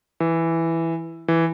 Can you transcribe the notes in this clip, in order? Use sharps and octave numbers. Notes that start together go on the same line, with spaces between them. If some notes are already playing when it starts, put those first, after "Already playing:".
E3
E3